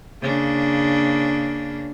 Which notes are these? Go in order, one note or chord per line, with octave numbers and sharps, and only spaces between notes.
C#3 A#3 D4